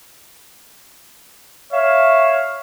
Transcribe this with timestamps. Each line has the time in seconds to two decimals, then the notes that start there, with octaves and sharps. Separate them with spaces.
1.72 C#5 E5 F5